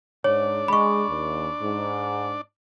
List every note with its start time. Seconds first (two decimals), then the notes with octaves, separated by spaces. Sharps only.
0.24 G#2 D4 C#5 D5
0.68 G#3 B5 C#6
1.08 D#2
1.60 G#2